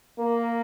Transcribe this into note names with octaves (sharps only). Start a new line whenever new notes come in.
A#3